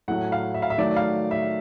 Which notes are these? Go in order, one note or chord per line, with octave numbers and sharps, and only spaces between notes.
A2 F#3 A3 F#5
F5
E5
F5
E5
D#3 F#3 A3 D5
F5
E5